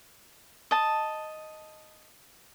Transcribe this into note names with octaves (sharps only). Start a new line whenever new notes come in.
D#5 A5